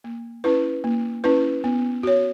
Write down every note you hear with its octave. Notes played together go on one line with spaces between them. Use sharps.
A#3
C#4 E4 B4
A#3
C#4 E4 B4
B3
F#4 C#5